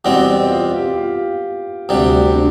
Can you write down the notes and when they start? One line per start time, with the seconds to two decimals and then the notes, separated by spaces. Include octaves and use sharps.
0.04 E2 B2 G3 B3 C4
0.51 F4
0.74 G4
0.96 F4
1.89 D2 C3 G3
2.24 C4
2.35 D4